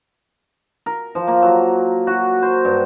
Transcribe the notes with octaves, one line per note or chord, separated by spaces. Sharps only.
A#4
F3
A#3
F#3
F#4
C5
G2